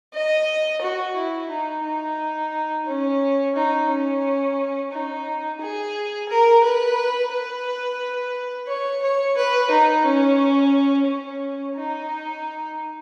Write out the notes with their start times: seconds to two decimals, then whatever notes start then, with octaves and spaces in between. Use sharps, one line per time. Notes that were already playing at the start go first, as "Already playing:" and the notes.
0.13 D#5
0.81 F#4
1.16 E4
1.49 D#4
1.83 D#4
2.86 C#4
3.55 D#4
3.89 C#4
4.92 D#4
5.61 G#4
6.28 A#4
6.63 B4
7.31 B4
8.67 C#5
9.02 C#5
9.37 B4
9.70 D#4
10.04 C#4
11.07 C#4
11.76 D#4